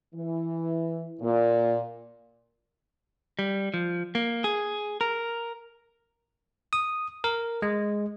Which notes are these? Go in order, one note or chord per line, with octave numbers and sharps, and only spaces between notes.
E3
A#2
G3
F3
A#3
G#4
A#4
D#6
A#4
G#3